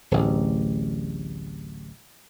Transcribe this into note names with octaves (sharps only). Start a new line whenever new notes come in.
D1 A1